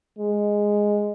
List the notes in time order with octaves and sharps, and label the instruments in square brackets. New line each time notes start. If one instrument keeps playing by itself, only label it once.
[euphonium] G#3